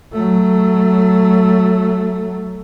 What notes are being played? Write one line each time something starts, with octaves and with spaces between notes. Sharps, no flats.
F#3 A3